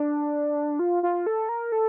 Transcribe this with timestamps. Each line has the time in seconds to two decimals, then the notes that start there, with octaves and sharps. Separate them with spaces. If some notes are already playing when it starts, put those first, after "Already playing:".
Already playing: D4
0.79 F4
1.03 F4
1.27 A4
1.49 A#4
1.72 A4